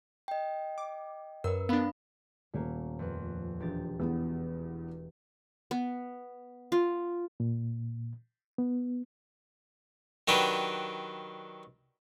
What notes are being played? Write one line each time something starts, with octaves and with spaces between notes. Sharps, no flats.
D#5 G5
D6
F#2 A#4 B4 E6
B3 D4 F5 B5
D#1 A3 A#3
F2 B4
E1 G4 A6
E2 B3
B3
F4
A#2
B3
D#3 F#3 D4 G4 B4